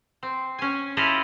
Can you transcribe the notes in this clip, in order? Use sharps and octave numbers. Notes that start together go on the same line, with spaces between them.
C4
C#4 G#5
E4 F4 G4 A4 D#5 F5